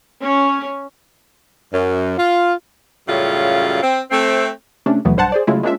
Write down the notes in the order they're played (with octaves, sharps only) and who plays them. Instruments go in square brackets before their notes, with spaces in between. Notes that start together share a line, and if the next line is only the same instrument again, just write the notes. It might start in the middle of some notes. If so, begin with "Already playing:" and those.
[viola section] C#4
[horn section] F#2
F4
[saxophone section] F#2 A2 C#3 G3 F4
C4
A3 C4
[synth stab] C3 A3 C#4 D4
D#2 B2 E3 F#3 A3 B3
B1 G2 C5 F#5 A5
G#4 C5 D5
C#3 F#3 G#3 A3 E4 F4
G#3 A#3 C#4 D4 F4 E5